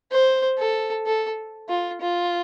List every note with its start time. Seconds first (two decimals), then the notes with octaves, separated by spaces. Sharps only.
0.11 C5
0.59 A4
1.06 A4
1.69 F4
2.01 F4